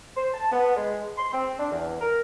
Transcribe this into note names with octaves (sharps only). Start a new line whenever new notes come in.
C5
A5
B3
G#3
C6
C4
D4
E2
A#4